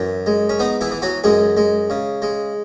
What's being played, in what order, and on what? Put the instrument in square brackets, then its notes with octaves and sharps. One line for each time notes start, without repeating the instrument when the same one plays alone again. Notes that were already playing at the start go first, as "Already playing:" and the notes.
Already playing: [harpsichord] F#2 E3
G#3
C#4
B3 D#4
E3 E4
E3
F#3 F#4
F#2 G#3 G#4
G#3
C#3
G#3